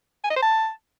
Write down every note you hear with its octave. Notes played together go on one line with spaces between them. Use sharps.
G#5
D#5
C5
A5